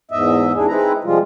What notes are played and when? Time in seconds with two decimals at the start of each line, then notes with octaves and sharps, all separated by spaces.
0.11 E2 G#2 D#5 E5
0.55 E2 G#2 C3 D4 E4 G#4
0.68 G#3 C4 D#4 E4 B4 A#5
1.04 C3 F3 G3 G#3 F4